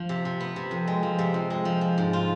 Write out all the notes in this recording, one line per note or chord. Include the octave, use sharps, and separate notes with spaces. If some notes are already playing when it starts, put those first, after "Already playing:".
Already playing: F3
C3
C3
B3
C3
F2
G#3
F3
C3
F2
G#3
F3
F3
G#2
F4